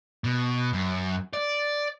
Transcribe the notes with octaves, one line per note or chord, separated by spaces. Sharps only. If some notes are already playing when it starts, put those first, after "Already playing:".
B2
F#2
D5